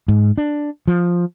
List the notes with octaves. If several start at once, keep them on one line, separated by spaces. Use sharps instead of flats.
G#2
D4
F3